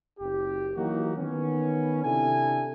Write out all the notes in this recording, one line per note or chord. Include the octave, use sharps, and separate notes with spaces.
F#1 G4
E3 F#3 A#3 D#4 F#4 G4
D#3 B3 C#4
C3 D4 E4 A4 G#5